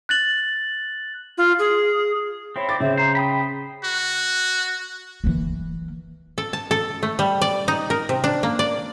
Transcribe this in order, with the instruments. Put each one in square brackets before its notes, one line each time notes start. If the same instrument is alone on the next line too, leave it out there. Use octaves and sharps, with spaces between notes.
[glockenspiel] F#6 A6 F#7
[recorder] F4
G#4
[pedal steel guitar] C4 E4 [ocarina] C#5
[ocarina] D6 [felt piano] A6
[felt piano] C#3 [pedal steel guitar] C4 [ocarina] E5
[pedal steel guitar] C5 [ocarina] A#5
[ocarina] G5 [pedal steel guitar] B5 D#6
[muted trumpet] F#4
[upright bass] E3 A#3
[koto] A4
A5
A4
A3
G3
D5
D#4
A#4
C3
D4
A#3
D5